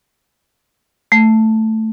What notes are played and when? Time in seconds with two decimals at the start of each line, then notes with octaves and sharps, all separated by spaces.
1.12 A3